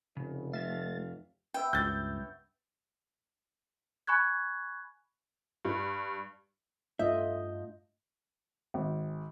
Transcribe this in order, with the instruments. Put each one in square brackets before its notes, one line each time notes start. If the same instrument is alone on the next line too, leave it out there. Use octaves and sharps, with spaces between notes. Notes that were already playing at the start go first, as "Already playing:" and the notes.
[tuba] F1 [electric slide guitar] C#3
[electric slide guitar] F2 E5 F5 [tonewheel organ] A3 A6
[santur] B3 E5 E6 [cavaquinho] G5
[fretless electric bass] C#2 G2 [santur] C#5 [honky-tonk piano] G6 A6
[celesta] G#5 B5 C#6 F#6 G#6
[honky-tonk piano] G2
[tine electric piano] G2 G6 [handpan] A3 F4 D#5 [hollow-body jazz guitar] E5
[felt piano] G#1